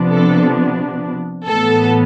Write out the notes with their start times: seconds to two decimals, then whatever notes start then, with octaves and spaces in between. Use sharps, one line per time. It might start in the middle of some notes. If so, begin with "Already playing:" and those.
Already playing: C3 F3 B3 D4
0.13 A4
1.47 A2 E3 B3 A4